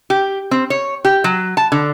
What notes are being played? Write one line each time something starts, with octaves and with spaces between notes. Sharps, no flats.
G4
C4
C#5
G4
F#3
A5
D3